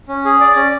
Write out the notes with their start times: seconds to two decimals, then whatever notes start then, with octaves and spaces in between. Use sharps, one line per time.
0.08 C#4
0.25 G#4
0.40 D5
0.56 C#4